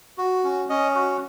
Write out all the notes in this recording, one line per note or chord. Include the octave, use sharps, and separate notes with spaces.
F#4
C#4
C#4 D#5
F#4